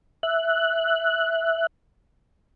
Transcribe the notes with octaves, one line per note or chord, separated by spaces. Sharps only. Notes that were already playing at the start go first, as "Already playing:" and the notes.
E5 F#6